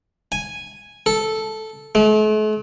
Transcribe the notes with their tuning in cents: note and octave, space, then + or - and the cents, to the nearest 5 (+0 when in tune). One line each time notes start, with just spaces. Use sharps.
G#5 -5
A4 -5
A3 -45